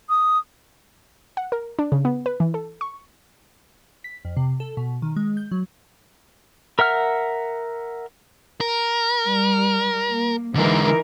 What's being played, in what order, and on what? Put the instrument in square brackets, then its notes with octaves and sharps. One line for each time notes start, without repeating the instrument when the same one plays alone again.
[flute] D#6
[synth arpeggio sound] F#5
A#4
D4
C#3
B3
B4
E3
A4
C#6
[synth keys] B6
F2
C3
A4
B2
D#3
G#3
G6
F#3
[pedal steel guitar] A#4 E5 F#5 F6
[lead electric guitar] A#4
[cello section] G3
A#3
[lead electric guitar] D3 G#3 [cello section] E3 D#4 A#4